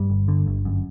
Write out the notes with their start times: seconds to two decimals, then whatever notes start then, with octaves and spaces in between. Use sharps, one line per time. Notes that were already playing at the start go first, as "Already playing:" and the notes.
Already playing: G2 G3
0.10 G1
0.28 D3
0.46 G1
0.65 F#2